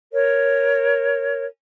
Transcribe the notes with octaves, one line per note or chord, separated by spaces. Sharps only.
A#4 C#5